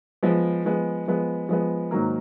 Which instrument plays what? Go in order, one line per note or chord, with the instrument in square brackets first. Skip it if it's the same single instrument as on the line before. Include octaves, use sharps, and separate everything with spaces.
[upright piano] F3 G#3 B3
F3 G#3 B3
F3 G#3 B3
F3 G#3 B3
G#2 D#3 F#3 A#3